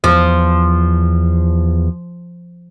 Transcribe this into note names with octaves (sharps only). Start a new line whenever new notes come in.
E2 F3